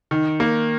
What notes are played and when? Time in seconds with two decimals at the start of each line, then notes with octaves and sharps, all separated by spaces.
0.11 D#3
0.40 A#3